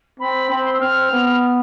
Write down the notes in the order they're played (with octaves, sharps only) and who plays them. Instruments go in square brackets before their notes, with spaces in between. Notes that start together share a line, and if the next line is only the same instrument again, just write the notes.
[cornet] C4 [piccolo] B5
[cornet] C4 [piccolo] B5
[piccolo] C6
E6
[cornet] C4 [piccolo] F6
[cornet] B3